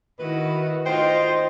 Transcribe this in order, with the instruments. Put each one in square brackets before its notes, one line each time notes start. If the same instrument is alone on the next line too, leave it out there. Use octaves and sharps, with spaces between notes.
[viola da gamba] D#3 E4 F#4 [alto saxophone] B4
[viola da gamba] D#4 F4 [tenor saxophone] C5 [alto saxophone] G5